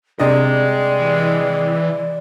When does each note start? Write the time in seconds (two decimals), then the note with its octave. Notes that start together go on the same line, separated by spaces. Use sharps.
0.20 C3 G3 G#3 D4 D5 D#5
0.99 E3